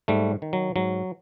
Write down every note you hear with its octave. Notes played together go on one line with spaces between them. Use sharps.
G#2 G3 A3
D#3
F#3
G#2 F#3